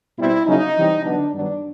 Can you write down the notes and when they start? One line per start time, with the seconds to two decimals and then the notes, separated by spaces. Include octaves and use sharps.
0.17 B2 G3 C4 E4
0.45 C#3 F#3 A#3 C#4 D#4
0.75 C3 E3 G3 C4
1.03 D3 F#3 B3 D4
1.32 G2 D#3 F#3 B3 D4